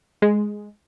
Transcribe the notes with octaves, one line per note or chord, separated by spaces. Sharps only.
G#3